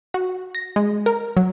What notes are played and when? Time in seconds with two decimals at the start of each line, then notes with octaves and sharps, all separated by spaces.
0.14 F#4
0.55 A#6
0.76 G#3
1.06 A#4
1.37 F#3